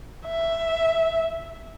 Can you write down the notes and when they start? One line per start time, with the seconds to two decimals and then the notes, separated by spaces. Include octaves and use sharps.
0.26 E5